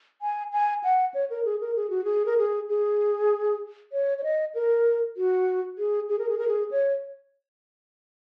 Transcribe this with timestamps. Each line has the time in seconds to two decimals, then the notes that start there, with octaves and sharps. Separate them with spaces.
0.22 G#5
0.52 G#5
0.84 F#5
1.14 C#5
1.30 A#4
1.45 G#4
1.61 A#4
1.76 G#4
1.90 F#4
2.05 G#4
2.26 A#4
2.38 G#4
2.69 G#4
3.92 C#5
4.18 C#5
4.24 D#5
4.55 A#4
5.17 F#4
5.78 G#4
6.09 G#4
6.19 A#4
6.29 G#4
6.38 A#4
6.48 G#4
6.71 C#5